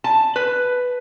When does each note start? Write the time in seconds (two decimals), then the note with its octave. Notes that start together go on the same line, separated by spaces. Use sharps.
0.04 A5
0.36 B4